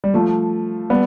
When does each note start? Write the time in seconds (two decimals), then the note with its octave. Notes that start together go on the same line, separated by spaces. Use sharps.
0.04 G3
0.14 F3 A3
0.90 G3 B3